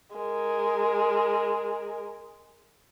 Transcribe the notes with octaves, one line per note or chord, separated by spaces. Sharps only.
G#3 A#4